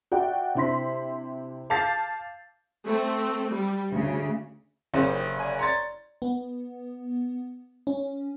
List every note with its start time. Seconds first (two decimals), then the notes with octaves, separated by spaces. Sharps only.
0.12 F#4 D5 E5 G5
0.55 C3 D4 E4 C5 C6 B6
1.70 F5 A5 D6 G6 A6 C7
2.84 A3 C4
3.50 G3
3.90 D2 C#3
4.94 F#1 C#4 D#4 G4 C5
5.36 D3 G#5
5.59 C#5 A#5 C6 A6
6.22 B3
7.87 C#4